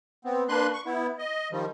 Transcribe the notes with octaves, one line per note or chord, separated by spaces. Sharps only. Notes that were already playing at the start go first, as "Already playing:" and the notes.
B3 C4
A#3 D4 B4 C6 F#6
C#6
B3 E4
D#5
D#3 F3 G3